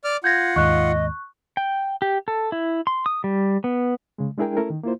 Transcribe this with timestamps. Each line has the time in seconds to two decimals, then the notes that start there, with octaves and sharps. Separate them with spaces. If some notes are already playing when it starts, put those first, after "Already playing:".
0.04 D5 D6 F6
0.24 F4 F#5 G6 G#6 A#6
0.56 D#2 G#2 D#5 C#6 F#6
1.57 G5
2.02 G4
2.28 A4
2.52 E4
2.87 C6
3.06 D#6
3.24 G3
3.64 B3
4.18 C#3 G#3
4.38 G#3 D4 E4 G#4 A#4 G5
4.57 A3 C#4 E4 A4 A#4
4.70 D#3
4.83 A#3 E4 F4 C5